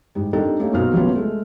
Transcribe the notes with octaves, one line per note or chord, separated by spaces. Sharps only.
G#2 G3
C4 D4 D#4 G4 A4 A#4
A3 A#3 C#4 D#4 G4
B1 A#3 B3 F#4 C5 F6
C3 F3 F#3 A#3 B3 C#4
G#3 A3